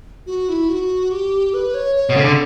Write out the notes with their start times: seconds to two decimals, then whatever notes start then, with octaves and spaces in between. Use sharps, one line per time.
0.27 F#4
0.49 E4
0.69 F#4
1.11 G4
1.54 B4
1.74 C#5
1.96 C#5
2.09 B2
2.16 C#3 A4
2.24 D3